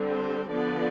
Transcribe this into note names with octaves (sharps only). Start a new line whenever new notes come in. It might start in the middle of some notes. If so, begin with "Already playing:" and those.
Already playing: D3 G3 C4
C5
D3 F3 B3 D5